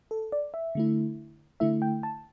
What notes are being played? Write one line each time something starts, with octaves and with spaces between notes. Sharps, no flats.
A4
D5
E5
D3 A3 E4
D3 A3 E4 E5
G5
A5